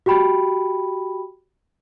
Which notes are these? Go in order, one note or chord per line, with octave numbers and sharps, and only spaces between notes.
F#4 G4 G5 B5